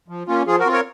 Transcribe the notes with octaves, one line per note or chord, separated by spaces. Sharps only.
F3
A#3 C#4 F4
F3 F4 G#4
F#4 A#4
C4 F4
A#4 C#5